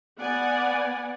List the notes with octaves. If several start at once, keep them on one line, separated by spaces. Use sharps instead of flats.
B3 D5 F#5 G#5